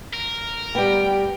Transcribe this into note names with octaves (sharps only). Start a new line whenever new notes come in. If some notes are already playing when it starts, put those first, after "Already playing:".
A#4
G3 B3 G4 G5